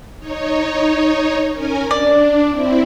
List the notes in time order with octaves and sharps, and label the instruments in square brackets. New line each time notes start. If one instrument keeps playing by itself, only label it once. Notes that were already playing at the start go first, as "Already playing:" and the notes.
[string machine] D#4 C#5
C#4 A#4 G#5
[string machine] D4 [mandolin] D5
[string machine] C4 E4